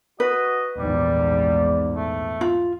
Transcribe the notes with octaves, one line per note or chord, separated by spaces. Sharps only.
F#4 B4 D#5
A#1 E2 G#2 G3 D5
A3
F4